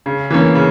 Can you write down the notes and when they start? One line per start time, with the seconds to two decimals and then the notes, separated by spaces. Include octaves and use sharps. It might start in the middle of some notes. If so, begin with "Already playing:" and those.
0.06 C#3
0.30 E3 A#3 C#4
0.55 C#3